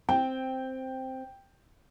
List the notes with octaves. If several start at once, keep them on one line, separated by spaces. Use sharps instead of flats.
C4 G5